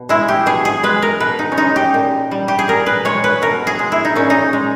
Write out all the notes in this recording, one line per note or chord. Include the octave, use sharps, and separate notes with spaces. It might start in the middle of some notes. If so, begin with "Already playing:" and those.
Already playing: B2
G#3 E4
G4
B2 G#4
G#4
G#3 B4
A#4
B2 B4
D#4
C#4
G#3 D#4
G4
A#2
G3
G4
G#4
A#2 A#4
B4
G#3 C#5
B4
B2 A#4
G#4
G#3
E4
D#4
A#2 C#4
D#4
G#3